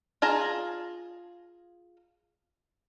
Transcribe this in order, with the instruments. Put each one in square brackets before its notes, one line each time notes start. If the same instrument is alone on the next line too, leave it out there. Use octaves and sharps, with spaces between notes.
[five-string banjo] F4 G#4 A5 A#5